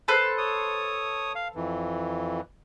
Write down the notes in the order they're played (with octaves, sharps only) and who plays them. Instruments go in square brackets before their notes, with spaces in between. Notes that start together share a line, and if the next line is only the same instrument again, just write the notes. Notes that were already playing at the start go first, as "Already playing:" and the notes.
[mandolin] A4 B4 C5
[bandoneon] C#5 D#6
F5
F2 E3